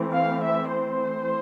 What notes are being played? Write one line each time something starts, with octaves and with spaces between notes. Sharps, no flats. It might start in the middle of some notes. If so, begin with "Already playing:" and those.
Already playing: E3 A3 C4
F5
E5
C5